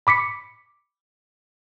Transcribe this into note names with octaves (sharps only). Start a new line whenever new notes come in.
B5 D6 B6 C#7